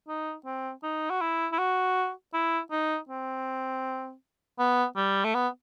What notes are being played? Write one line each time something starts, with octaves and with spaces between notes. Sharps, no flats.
D#4
C4
D#4
F#4
E4
E4
F#4
E4
D#4
C4
B3
G3
A3
B3